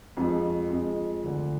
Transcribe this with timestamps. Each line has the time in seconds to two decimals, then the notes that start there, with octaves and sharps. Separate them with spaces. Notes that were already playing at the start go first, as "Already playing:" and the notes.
0.17 F2 F3 G#3
0.70 F2 F3 G#3
1.24 D2 D3 F3